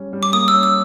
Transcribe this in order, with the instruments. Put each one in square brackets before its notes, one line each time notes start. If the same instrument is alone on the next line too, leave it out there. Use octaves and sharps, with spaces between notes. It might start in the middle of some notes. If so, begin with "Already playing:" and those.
Already playing: [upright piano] G3 C#4
G3
[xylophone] D6
[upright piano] A#3 [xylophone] D#6
[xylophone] E6
[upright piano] C#4
[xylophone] E6